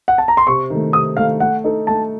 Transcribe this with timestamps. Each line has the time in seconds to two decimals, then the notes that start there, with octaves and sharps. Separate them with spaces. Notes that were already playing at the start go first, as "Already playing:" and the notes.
0.08 F#5
0.18 A5
0.28 A#5
0.37 C6
0.47 C3 C#6
0.70 D#3 A3
0.93 C3 D#6
1.17 D#3 A3 F5
1.40 A3 F#5
1.64 D#4 A4
1.87 A3 A5